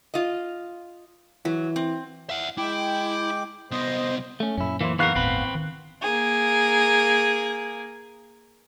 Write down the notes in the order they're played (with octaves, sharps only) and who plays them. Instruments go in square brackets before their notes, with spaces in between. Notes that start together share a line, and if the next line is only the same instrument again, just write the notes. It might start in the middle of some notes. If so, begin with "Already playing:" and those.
[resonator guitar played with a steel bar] F4 D#5
[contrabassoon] E3 [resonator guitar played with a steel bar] F#3
[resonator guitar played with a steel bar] C4
[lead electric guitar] E5 F#5
[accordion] G#3 G5 D6 [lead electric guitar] E4
[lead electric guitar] C2 B3 [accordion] C5 D#5
[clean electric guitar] A3 C#4
[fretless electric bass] F#2 A#2 [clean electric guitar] C#4 E4
[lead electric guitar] E3 [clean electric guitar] A#3 E4 C5
[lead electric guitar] E3 A#4 [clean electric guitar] B3 F5 [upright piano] C#6 F#6 C7
[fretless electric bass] G1 D#2 A2 [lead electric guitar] C4 B4
[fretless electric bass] D#3
[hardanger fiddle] A#3 G#4